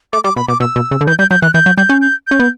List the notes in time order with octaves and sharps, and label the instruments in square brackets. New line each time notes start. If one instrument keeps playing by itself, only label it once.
[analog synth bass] A3 [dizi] D6
[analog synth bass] G3 [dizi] D6
[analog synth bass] B2 [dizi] B5
[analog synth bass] B2 [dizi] D6
[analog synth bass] B2 [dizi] E6
[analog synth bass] B2
C#3
D3
[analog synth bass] E3 [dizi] G6
[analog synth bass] G3 [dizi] G6
[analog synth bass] F#3 [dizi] G6
[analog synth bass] E3 [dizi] F#6
[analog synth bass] E3 [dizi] G6
[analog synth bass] F#3
[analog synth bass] G3 [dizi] G6
[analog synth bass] C#4
[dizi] G6
[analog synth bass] C#4 [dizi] G6
[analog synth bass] B3